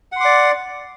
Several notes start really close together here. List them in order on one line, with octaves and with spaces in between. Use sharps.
F#5 C6 D6 D5